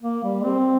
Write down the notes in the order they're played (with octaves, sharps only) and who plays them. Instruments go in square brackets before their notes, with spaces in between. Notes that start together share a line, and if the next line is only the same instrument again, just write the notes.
[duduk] A#3
G3
C4